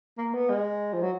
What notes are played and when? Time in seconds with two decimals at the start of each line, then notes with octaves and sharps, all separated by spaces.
0.18 A#3
0.34 B3
0.49 G#3
0.93 F3
1.02 F#3